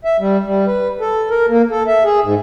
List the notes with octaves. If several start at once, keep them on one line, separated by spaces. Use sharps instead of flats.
E5
G3
G3
B4
A4
A#4
A#3
A4
E5
G#4
G#2